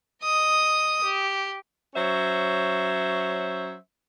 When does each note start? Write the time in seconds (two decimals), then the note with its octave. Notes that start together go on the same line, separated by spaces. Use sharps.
0.23 D#5 D#6
1.04 G4
1.93 F#3 C#4 C5 E5